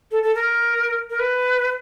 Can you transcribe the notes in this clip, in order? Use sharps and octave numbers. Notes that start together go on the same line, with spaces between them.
A4
A4
A#4
A#4
B4